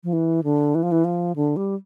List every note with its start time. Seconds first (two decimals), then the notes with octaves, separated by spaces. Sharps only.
0.04 F3
0.13 E3
0.44 D3
0.75 E3
0.83 F3
0.92 E3
1.05 F3
1.36 D3
1.57 G3